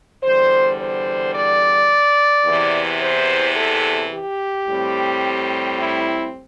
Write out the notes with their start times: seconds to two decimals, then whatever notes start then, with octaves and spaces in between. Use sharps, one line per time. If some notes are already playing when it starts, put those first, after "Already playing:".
0.24 E2 D3 G3 C5
0.80 C5
1.34 D5
2.46 E2 C3 E3
3.01 C5
3.56 A4
4.12 G4
4.67 A2 G3 C4
5.78 E4